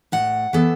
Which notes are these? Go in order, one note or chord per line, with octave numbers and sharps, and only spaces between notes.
A2 F#5
E3 B3 A4